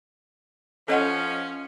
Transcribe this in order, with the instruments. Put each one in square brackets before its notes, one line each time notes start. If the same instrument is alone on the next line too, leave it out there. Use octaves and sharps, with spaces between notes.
[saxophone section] F3 C#4 [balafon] A4 D#5 F#5